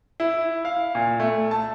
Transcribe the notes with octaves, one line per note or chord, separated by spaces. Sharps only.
E4
F5
A#2
A3
A5